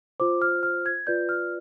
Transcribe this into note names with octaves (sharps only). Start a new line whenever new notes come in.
F4 C5 D6
F6
F6
G#6
F4 B4 D5 G6
F6